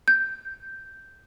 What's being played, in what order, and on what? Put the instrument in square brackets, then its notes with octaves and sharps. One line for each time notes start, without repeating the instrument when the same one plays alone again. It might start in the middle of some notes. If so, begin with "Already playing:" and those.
[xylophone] G6